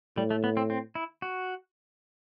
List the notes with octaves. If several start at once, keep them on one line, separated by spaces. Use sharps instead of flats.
A2 G3
A3
B3
C4
C4
E4
F#4